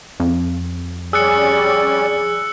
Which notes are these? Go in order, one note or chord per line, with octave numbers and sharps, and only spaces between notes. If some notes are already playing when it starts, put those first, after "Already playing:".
F2
G3 C#4 G#4 D5 E6 F#6 C#7